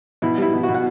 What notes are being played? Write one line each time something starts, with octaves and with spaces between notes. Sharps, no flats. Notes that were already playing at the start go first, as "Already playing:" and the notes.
B2 E4
G3 E4
B2
F#4
B2
F#5